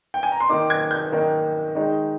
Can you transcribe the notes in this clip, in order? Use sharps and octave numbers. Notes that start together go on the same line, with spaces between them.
G5
G#5
A#5
C6
D#3 A#3 D#4 D6
G#6
G6
D#3 A#3 D#4
D#3 G#3 D#4